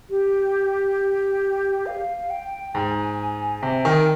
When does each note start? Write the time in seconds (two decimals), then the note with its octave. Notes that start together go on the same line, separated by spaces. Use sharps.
0.10 G4
1.86 F5
2.30 G5
2.74 G#2 G#5
3.62 C3 G5
3.85 D#3